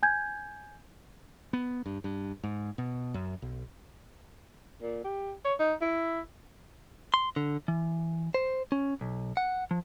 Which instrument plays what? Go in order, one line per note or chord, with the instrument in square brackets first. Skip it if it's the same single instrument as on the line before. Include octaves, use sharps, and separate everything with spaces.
[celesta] G#5 G6 G#6
[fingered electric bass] B3
G2
G2
G#2
B2
F#2
B1
[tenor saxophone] A#2
G4
C#5
D#4
E4
[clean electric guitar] C6
D3
E3
C5
C#4
B1
F#5
F3